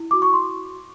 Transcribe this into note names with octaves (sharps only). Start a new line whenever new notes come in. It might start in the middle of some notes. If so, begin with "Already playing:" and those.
Already playing: E4
F#4 D6
C#6
C6